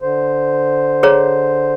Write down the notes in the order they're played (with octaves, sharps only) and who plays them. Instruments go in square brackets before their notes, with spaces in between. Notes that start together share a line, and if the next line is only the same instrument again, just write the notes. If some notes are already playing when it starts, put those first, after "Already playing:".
[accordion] D3 C5
[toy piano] G#4 C#5 A#5